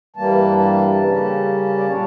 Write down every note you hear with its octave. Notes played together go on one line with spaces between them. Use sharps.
G2 E3 G3 A#3 A5
A5
C#3 G3 A#3 C#4
D5
A#2 G3 D4 C#5